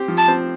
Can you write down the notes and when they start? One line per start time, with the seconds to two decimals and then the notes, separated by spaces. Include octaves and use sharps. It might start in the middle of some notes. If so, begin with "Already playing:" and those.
Already playing: C4 G4
0.08 F3
0.18 A5
0.28 C4